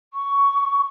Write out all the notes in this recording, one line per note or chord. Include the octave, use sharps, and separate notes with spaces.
C#6